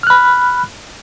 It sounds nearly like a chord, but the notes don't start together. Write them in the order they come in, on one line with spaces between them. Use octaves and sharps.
F6 F#6 B5